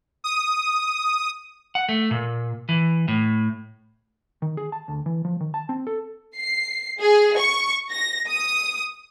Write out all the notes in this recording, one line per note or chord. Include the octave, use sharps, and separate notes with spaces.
D#6
F#5
A3
A#2
E3
A2
D#3
G#4
A5
D2
E3
F3
D#3
A5
C4
A4
C7
G#4
C#6
A#6
D#6